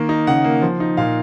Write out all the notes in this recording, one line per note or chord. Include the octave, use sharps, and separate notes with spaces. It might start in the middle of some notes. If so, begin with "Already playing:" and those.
Already playing: D#3 A#3
D#4
C#3 F#5
A#3
F3
D#4
A#2 F5